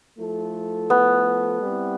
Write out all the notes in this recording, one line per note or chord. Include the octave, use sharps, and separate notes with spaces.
F3 A3 E4 A4
B3
G3 C4 E4